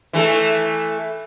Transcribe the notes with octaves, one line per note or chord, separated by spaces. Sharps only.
E3 A3 A4